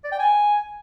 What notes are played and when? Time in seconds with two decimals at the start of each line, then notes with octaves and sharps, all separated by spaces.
0.04 D5
0.12 G5
0.20 G#5